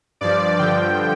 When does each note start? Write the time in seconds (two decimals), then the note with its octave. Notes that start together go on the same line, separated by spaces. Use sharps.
0.21 G2 F3 D5
0.59 G2 D3 F3 G5